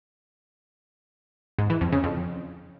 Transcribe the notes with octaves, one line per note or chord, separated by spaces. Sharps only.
G#2
E3
F2
C#3
F2